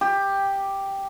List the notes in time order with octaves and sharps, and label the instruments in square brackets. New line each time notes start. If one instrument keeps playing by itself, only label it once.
[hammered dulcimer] G4